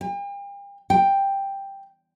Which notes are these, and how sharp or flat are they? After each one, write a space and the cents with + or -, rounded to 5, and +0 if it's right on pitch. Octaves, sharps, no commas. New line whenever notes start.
G5 +40
G5 +5